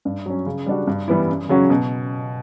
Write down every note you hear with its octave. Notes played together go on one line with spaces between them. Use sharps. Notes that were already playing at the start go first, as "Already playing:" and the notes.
G2
F#3 C#4
C#3
G3 D4 F#4
G2
E3 G3 B3 E4
F#2
C#3 F#3 C#4 F#4
B2